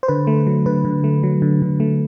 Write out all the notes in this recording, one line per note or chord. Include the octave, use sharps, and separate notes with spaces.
C5
D3 B4
A3
F#3
D3 B4
D3
A3
F#3
D3
D3
A3